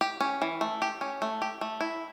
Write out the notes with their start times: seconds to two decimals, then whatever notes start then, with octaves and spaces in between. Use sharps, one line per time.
0.01 G4
0.21 C#4
0.42 E3
0.61 A3
0.82 G4
1.01 C#4
1.22 A3
1.42 G4
1.61 A3
1.81 E4